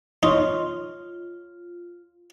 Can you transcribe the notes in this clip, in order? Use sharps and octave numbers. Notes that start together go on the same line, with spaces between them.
D#4 F4 C#5 C6 C#6